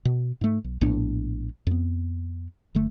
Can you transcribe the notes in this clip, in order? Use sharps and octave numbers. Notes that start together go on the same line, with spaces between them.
B2
G#2 A3
B1
A#1 A2 B3 D4
F2 B3
F#1 D3 A3